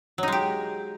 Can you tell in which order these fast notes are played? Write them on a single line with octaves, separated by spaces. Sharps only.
F#3 D#4 G#3 G4